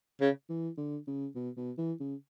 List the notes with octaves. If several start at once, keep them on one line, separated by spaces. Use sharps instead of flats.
C#3
E3
D3
C#3
B2
B2
E3
C#3